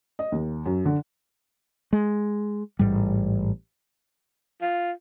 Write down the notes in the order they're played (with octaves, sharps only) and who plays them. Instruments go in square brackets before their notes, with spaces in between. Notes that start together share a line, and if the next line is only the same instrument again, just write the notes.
[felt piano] D#5
D#2
F#2
D3
[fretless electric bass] G#3
A1 G#2 G3
[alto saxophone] F4